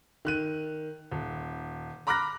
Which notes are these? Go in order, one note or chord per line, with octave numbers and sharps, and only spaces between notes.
D#3 F#6 D#7
D#1
A#5 B5 D6 F6 F#6 A#6